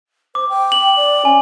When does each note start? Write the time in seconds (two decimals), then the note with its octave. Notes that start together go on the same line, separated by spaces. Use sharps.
0.35 C5 D6
0.49 G5
0.72 F#7
0.97 D5
1.25 C#4 G#5